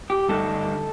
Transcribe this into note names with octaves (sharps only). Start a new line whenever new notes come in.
G4
G2 D3 A3 D#4 A4